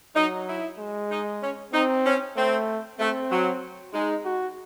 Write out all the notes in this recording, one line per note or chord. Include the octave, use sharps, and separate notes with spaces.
F#3 D#4
E4
G#3
D#4
C#4
C4 D#4
C#4
A3 C4
A3 C4
F#3
G#3 D#4
F#4